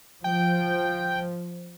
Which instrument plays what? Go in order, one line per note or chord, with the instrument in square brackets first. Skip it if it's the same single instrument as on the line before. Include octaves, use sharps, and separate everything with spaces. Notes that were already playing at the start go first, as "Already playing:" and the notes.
[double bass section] F3 [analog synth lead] G5